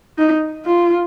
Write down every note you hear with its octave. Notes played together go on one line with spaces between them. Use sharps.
D#4
F4